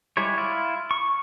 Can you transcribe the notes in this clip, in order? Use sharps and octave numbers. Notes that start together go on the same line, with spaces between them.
G3 G#3 E4 C#5
E4 F4
C#6